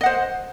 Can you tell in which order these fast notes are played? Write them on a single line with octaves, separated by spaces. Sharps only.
D#5 F#5 C5